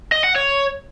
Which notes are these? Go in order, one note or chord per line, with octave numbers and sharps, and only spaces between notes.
D#5
F#5
C#5